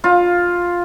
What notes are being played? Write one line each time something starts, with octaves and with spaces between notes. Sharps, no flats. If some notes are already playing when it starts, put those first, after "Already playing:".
F4